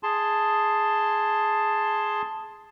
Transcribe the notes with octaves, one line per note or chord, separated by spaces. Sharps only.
G#4 A5 C6